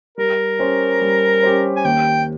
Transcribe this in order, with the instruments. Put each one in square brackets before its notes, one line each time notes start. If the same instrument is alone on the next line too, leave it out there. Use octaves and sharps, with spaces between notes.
[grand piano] G3 [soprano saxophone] A#4
[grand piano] C#4 G4 C5
G3
C#4 G4 C5
[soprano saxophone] G#5
[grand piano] D#2 [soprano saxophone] G5